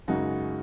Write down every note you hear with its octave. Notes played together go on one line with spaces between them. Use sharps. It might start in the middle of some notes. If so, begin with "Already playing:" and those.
F#2 C#3 G#3 D#4 F#4